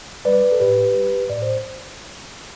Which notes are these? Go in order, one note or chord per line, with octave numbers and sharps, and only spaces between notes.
G3 B4 D5
A4
A2 G4 B4
G3
A2 D5
C5